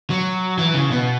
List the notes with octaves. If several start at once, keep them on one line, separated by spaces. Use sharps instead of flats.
F#3
E3
C#3
B2